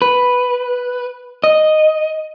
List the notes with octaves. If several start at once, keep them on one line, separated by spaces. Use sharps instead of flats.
B4
D#5